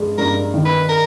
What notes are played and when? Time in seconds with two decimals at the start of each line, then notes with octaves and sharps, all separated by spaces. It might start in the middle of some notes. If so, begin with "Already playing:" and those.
Already playing: G2 G#3
0.18 G2 A#4
0.54 D#3
0.65 B4
0.89 A#4